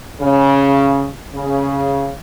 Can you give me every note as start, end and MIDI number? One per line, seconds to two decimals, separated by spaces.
0.21 1.09 49
1.35 2.09 49